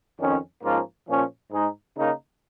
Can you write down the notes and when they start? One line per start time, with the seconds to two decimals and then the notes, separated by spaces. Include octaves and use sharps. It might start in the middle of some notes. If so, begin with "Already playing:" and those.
0.20 F2 D#3 C#4
0.63 G#2 F3 A#3 C#4 F4
1.08 A#2 F3 C#4
1.51 G#2 G#3 D#4 G#4
1.95 C#3 A#3 D#4 A#4